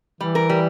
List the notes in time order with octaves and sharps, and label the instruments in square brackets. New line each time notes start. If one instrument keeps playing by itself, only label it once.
[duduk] E3 [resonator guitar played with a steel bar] G3
[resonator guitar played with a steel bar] A#4
G3